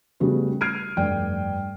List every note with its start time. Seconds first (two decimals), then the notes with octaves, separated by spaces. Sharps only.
0.20 C#3 G3 A3 B3 F#4
0.61 F6 G#6 C7 D7 D#7
0.97 F1 G2 D5 G5